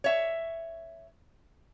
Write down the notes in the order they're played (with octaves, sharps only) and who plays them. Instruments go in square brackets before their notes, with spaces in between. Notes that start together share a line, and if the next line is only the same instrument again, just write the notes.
[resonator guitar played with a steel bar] C#5 E5